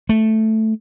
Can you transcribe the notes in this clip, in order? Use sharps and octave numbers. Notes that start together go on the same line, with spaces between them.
A3